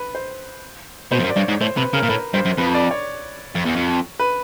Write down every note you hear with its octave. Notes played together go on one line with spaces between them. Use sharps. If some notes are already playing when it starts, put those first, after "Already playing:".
Already playing: B4
C5
B2 C5
F2
F#2
D5
G2 C#5
G#2
A2 C5
C3 B4
C#3 A#4
A#2
A2 B4
G2 C5
F#2
F2 B4
D5
C#5
F2
E2
F2
B4